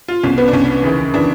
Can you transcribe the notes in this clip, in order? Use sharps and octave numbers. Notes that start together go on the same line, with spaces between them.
F4
C2 B2 C#4
B3
D4
C2 B2 C#4
D#2 C#3 E3
C#3 E3 D4